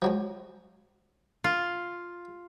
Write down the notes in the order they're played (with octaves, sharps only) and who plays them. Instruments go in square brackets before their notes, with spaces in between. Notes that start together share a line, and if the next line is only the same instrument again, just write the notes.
[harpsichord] F3 F#3 G#3
[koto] F4